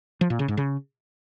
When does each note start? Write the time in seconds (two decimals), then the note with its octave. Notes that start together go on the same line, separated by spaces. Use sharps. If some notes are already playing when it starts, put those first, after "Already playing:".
0.21 F3
0.30 A#2
0.39 C#3
0.48 G#2
0.57 C#3